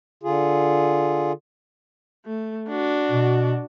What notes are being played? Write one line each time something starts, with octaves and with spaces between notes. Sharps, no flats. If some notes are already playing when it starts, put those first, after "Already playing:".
D3 F4 G#4
A3
D4 F#4
B2